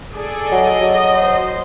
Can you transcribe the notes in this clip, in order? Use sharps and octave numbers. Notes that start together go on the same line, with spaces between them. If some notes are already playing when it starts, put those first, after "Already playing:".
G#4 A4 D5
F#3 D#5
F#3
C5